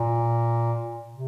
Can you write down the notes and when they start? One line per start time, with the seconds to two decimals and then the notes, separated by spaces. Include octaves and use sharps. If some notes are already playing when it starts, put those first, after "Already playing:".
Already playing: A#2
1.12 C3